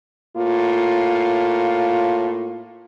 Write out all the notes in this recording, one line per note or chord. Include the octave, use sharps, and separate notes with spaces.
A2 A#3 F4